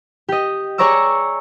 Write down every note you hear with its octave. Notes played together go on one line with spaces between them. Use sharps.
G4 D#5
G#4 C#5 D5 A#5 C#6 E6